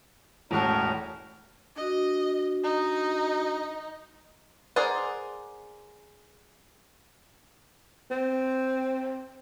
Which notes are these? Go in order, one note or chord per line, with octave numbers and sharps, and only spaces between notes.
E1 A2 C#4 F#4 A#4 A5
D4 F#4 D#5
D#4
G#4 A#4 C5 D5 F#5
C4